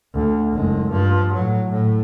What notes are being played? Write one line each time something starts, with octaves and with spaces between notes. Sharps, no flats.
D2
F#1 G#3
G2 F3
A2 F#3
A2